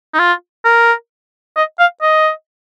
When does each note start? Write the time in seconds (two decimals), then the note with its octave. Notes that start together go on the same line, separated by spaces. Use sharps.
0.14 D#4
0.19 F4
0.65 A#4
1.56 D#5
1.79 F5
2.02 D#5